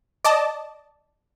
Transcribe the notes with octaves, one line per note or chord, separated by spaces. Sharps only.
D5 D#5 A5